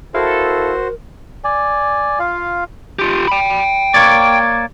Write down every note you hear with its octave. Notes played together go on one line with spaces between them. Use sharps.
E4 F#4 A4 A#4 C5 F5
D5 G#5
F4 F5
F4 G4
G5 B5
A#3 C#5 D5